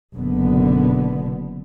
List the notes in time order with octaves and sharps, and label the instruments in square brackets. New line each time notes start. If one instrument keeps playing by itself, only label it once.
[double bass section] F#1 B2 D3 B3